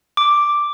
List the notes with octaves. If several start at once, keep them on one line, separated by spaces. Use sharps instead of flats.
D6